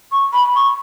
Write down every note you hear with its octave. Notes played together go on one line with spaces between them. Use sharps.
C#6
B5
C#6